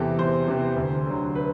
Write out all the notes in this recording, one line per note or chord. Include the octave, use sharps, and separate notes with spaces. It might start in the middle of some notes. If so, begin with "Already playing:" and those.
Already playing: E2 C3 E3 G4 A4
E2 C5
C3 E3
D2
D3 F#3
B4